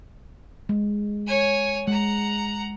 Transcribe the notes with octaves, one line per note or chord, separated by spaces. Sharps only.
G#3
C#5 G#5
G#3 F#5 A#5